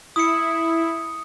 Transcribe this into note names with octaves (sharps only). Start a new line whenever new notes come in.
E4 D#6 C#7